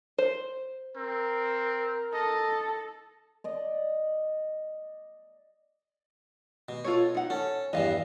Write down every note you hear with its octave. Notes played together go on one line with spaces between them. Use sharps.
C5
C4 A#4
A4 D#5
D5 D#5
B2
F4 A4 C#5
D#4 F#5
C#4 A4
E2 G2 E3 D#5 F5